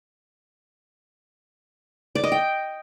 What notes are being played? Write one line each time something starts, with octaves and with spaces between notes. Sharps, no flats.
D5
D#5
G5